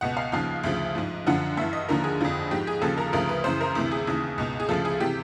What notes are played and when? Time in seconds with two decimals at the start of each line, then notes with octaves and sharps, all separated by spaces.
0.01 C#2 B2 F#5
0.17 F5
0.32 D#2 C#3 F3 F5
0.63 D2 C#3 F3
0.95 G#2 F3
1.27 F#2 D3 F3 F#5
1.57 G2 E3 E5
1.73 D#5
1.89 D#2 D3 F3 A#4
2.04 G#4
2.21 F2 D3 F3
2.51 G#2 F3 G4
2.67 G#4
2.82 D#2 C#3 F3 A4
2.98 A#4
3.13 D2 C#3 F3 A#4
3.29 B4
3.44 F#2 C#3 E3 C5
3.61 A#4
3.75 D2 C3 E3 E4
3.91 G#4
4.07 D#2 C#3 E3
4.38 C#2 B2
4.60 G#4
4.69 D2 C#3 F3 A4
4.85 G#4
5.00 C3 E3 G4